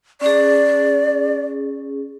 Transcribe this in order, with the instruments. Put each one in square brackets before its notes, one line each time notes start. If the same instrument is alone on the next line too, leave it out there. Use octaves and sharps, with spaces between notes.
[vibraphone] C#4 G#4 [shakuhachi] D5